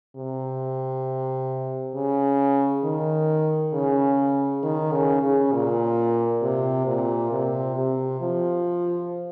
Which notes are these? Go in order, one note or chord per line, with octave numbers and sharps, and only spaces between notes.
C3
C#3
D#3
C#3
D#3
C#3
C#3
A#2
C3
A#2
C3
C3
F3